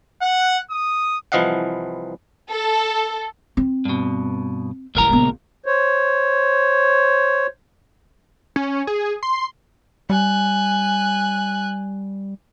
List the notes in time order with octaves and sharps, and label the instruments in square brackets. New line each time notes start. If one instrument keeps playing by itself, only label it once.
[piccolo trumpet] F#5
D#6
[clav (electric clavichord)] C2 E3 F3 D#5 F5 F#5
[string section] A4
[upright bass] C4
[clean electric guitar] G2 B2
[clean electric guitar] C#2 A#4 A#5 [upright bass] G2 E3
[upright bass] A#1 B3
[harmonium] C5 C#5
[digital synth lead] C#4
G#4
C6
[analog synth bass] G3 [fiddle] G#5 F#6